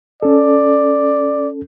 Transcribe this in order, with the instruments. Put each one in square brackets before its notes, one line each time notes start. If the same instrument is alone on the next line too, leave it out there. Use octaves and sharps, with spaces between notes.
[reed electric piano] C#4 A4 [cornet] D5